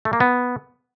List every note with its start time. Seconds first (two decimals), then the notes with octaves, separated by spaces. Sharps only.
0.05 A3
0.13 A#3
0.20 B3